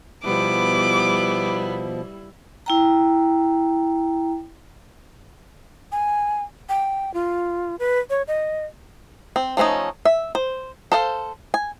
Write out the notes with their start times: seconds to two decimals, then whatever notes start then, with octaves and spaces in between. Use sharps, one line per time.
0.25 B2 F3 G3 B3 E4 D6
2.66 E4 G5 A#5
5.92 G#5
6.69 G5
7.14 F4
7.79 B4
8.10 C#5
8.28 D#5
9.36 C4
9.57 F3 A3 C4 C#4 D#4
10.05 E5
10.35 C5
10.92 A4 C5 F5
11.54 G#5